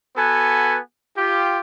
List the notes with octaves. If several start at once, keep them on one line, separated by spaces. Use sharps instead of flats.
B3 F#4 A4 B4 G#5
F4 G4